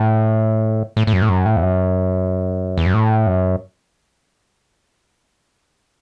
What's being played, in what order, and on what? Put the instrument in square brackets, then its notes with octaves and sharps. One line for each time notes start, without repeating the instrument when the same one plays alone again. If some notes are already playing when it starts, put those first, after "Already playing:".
Already playing: [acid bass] A2
A2
A2
F#2
A2
F#2
A2
E2
F#2
E2
F#2
A2
F#2